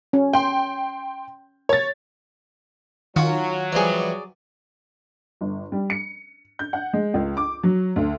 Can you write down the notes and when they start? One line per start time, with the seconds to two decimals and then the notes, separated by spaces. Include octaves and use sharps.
0.13 C#4
0.33 G5 C6
1.69 C#5 A6
3.16 D#3 F#3 C#4 F4 F#4 F#5
3.72 E3 F3 G3 G#4 D5
5.41 G1
5.72 G3
5.90 C#7
6.59 G6
6.73 F#5
6.93 G#3
7.14 C#2
7.37 D6
7.63 F#3
7.96 D2